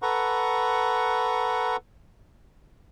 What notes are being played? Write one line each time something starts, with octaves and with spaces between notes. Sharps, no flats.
A4 B4 F#5 A#5 C#6